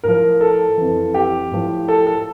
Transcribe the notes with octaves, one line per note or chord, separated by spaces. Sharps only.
A2 F3 A#4
A4
F2 E3
G4
A2 F3
A4
A4